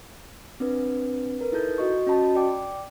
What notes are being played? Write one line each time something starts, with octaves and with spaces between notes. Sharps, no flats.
C4 D4 B4
A#4 B4
D#4 E4 A4 G6
F#4 D#5 C#6
C#4 F#4 D#5 A5 B5
D5 G5 D6